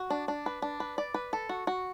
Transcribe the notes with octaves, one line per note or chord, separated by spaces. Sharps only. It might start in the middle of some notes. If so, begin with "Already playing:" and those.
Already playing: F#4
D4
D4
B4
D4
B4
D5
B4
A4
F#4
F#4